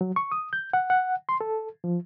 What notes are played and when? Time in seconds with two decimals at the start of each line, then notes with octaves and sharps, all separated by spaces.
0.01 F#3
0.16 C#6
0.32 D#6
0.53 G6
0.73 F#5
0.90 F#5
1.29 C6
1.41 A4
1.84 F3